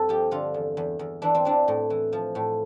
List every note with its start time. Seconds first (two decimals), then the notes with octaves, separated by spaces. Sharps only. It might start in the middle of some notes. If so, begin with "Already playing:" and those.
Already playing: G2 C4 A4
0.09 F3 G4
0.31 D3 F4
0.54 E2
0.77 E2
0.99 E2
1.22 E3 D4
1.35 C4
1.45 E3 D4
1.68 A2
1.90 E3
2.13 F3
2.35 A2